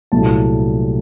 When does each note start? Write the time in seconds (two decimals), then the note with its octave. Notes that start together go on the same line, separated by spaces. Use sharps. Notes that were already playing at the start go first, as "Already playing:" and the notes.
0.12 C2 A#2 F#3 A3 A5